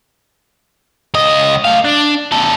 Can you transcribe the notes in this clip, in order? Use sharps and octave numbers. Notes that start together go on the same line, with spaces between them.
C#2 D#5
A3 F5
D4
E2 A4